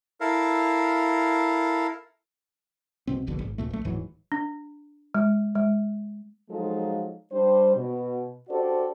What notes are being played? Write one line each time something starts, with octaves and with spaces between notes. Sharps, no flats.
E4 A4 A#4 F5
C2 B2 C4
E1 A#1 B2 D3
G#1
C#2 A#2 A3
A#1 A3
D1 G#2 E3 F#3
D4
G#3
G#3
F3 F#3 G#3 D#4 F4 A4
G3 D4 C5
B2
D4 F#4 G4 A4 C5 D5